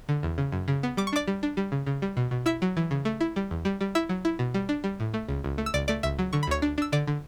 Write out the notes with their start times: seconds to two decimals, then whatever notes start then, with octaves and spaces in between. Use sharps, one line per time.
0.09 D3
0.23 E2
0.38 C#3
0.52 F#2
0.68 C#3
0.83 B3
0.97 G3 D6
1.07 C#6
1.13 D4 D5 D6
1.28 G3
1.43 D4
1.57 G3
1.72 C#3
1.86 C#3
2.02 G3
2.17 B2
2.31 B2
2.46 E4 E5 E6
2.62 F#3
2.77 E3
2.91 C#3
3.05 A3
3.21 E4
3.36 G3
3.51 E2
3.65 G3
3.81 G3
3.95 E4 E5 E6
4.09 F#3
4.25 E4
4.39 B2
4.54 G3
4.69 D4
4.84 G3
5.00 A2
5.14 A3
5.29 C#2
5.44 C#2
5.58 A3
5.66 E6
5.74 C#2 D5 D6
5.88 A3 D5 D6
6.03 C#2 E5 E6
6.19 F#3
6.33 D3 C#6
6.43 B5
6.47 D2 C#5 C#6
6.62 D4
6.78 D4 E6
6.92 D3 D5 D6
7.07 D3